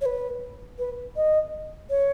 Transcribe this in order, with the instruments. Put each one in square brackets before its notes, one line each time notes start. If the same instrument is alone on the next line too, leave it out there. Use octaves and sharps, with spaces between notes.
[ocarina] C#5
B4
B4
D#5
C#5